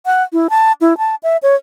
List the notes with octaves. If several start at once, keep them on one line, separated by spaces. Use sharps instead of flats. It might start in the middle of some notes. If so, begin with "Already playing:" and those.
F#5
E4
A5
E4
A5
E5
C#5